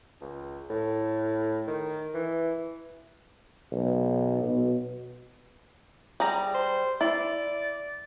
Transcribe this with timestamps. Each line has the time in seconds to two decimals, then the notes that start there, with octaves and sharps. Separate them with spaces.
0.21 C#2
0.70 A2
1.67 D#3
2.14 E3
3.72 B1
4.44 B2
6.20 G3 G#4 A#5
6.54 C5
7.01 E4 D5